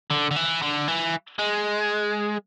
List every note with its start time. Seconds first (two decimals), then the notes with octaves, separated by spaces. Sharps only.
0.10 D3
0.31 D3
0.36 E3
0.62 D3
0.88 E3
1.39 G#3